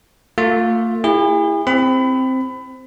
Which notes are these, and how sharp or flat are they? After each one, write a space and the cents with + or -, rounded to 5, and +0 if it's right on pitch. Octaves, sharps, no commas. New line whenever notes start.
A3 +45 F4 +20
E4 +0 G#4 -45
C4 +0 B5 +25